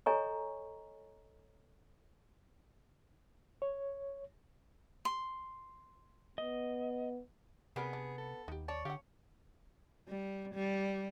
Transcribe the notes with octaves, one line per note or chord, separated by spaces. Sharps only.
A4 C#5 D#5 G#5 A#5 C#6
C#5
C6
B3 D#5
C3 G3 B3 G#4 A#4 D5
D4
A4
D#2 D#4 G4
C#5 D5 A5
D3 G4 F5 F#5
G3
G3